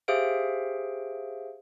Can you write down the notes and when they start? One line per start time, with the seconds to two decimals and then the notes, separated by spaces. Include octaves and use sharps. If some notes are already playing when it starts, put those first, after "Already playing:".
0.08 G4 G#4 C5 E5 F5 D7